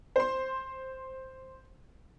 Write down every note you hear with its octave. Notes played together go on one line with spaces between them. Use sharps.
C5 C6